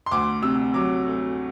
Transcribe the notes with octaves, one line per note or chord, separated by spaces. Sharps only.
C6
D2 D6
C3 E6
F#3 D6
A3